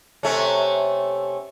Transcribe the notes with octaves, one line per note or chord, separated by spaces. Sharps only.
C3 A3 C#4